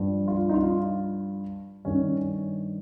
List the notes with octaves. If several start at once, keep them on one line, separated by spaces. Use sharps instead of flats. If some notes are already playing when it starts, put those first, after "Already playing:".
Already playing: G2 F3
F4
D#4
F4
G2 D#3 C#4